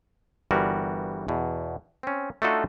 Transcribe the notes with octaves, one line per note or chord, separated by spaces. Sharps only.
G1 E3 G3 F#4 A#4
E2 B2
C4 C#4
A3 D4 D#4 F4 F#4 A4